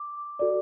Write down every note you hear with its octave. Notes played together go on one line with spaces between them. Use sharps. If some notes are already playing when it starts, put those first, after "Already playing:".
Already playing: D6
F#4 A4 D5